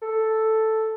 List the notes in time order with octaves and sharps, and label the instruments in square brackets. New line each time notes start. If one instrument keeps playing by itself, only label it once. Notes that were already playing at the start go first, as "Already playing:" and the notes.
[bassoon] A4